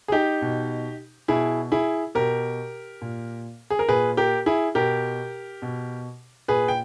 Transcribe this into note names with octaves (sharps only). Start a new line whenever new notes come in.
G#4
D#4 G4
B2
B2 E4 G#4
E4 G#4
B2 G4 A#4
A#2
G#4
A#4
A#2 G#4 B4
G4 A#4
E4 G#4
B2 G4 A#4
B2
A#2 G#4 B4
G5